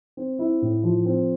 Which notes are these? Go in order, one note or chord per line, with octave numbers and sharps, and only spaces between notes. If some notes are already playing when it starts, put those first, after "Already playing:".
C4
E4
A2
F3
C4